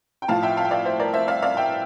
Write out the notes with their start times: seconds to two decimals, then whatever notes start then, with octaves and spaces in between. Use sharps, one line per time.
0.22 G5
0.28 A2 F3 F5 A5
0.43 E5 G5
0.57 F5 A5
0.65 G5
0.71 D5 F5
0.85 C5 E5
0.99 A#4 D5
1.14 C5 E5
1.28 D5 F5
1.42 D5 F5
1.57 E5 G5